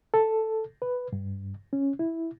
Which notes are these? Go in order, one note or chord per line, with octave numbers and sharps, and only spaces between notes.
A4
B4
G2
C#4
E4